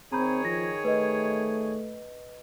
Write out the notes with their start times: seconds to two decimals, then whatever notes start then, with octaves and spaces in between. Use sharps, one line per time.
0.12 D#3 C4 G#4 C#5 A#5 B5 G6
0.45 F3 A#6
0.85 A3 B4 D#5